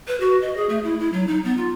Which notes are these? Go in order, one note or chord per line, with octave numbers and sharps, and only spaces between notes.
B4
F#4
D#5
G#4
A3
E4
E4
F#3
D#4
B3
F4